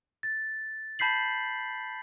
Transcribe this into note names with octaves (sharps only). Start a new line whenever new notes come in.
A6
A5 B5 G6 B6 C7 F#7